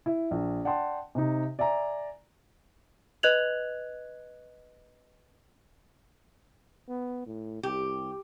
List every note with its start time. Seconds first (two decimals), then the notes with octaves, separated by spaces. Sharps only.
0.06 E4
0.31 A#1
0.65 D5 F#5 G5 A5 C6
1.15 C3 D#4
1.59 D5 E5 G#5 A#5
3.23 B4 D#5 F#6 G#6 F7 F#7
6.89 B3
7.26 A2
7.63 C2 G4